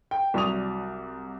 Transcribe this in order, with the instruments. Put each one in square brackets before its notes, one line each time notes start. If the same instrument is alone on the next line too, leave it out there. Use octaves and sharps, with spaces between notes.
[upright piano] G5
C2 F#3 D5 C#6 D#6 F7